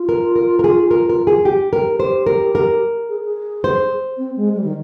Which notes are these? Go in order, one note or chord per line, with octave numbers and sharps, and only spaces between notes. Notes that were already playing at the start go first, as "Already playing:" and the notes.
Already playing: F4
A#4
A#4
A#4
G#4
A#4
A#4
G#4
G4
A#4
G4 C5
A#4
A#4
G#4
G#4
C5
C4
G#3
G3
D#3